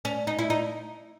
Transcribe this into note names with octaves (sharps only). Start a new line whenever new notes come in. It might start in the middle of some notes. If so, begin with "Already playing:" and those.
C#4
D#4
E4
D#4